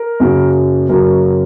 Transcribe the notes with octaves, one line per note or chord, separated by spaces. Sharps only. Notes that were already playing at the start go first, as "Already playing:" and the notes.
Already playing: A#4
F#2 C#3 F#3 A#3
F#2 C#3 F#3 A#3 A#4